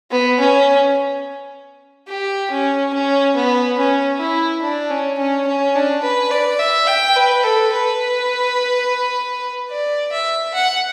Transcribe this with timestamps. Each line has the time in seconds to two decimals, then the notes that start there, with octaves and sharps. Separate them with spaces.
0.11 B3
0.40 C#4
2.08 G4
2.51 C#4
2.94 C#4
3.36 B3
3.78 C#4
4.20 E4
4.62 D4
4.90 C#4
5.18 C#4
5.47 C#4
5.76 D4
6.03 B4
6.31 D5
6.59 E5
6.88 G5
7.16 B4
7.44 A4
7.73 B4
9.70 D5
10.13 E5
10.54 F#5